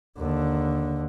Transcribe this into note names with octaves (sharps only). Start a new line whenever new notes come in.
D#2 D3